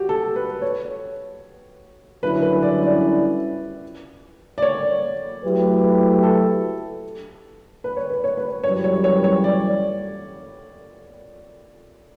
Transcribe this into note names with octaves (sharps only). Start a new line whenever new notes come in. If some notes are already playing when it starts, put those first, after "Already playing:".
Already playing: F#4 G4
A4
B4
C#5
F#2 D3 G3 C#4 E4 B4
B4
D5
D5
D5
C#5
F#3 A3 E4 G4 B4
A4
B4
C#5
B4
C#5
B4
F#2 E3 G3 C#5
C#5
C#5
C#5
D5